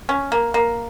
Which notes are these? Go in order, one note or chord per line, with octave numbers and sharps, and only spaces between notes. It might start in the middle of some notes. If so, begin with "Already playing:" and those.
C#4
A#3
A#3